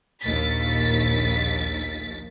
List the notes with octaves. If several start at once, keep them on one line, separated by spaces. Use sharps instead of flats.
A#1 D#2 A6 B6